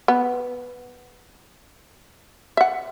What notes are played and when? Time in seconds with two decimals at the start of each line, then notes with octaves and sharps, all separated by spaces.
0.08 B3
2.57 E5 F#5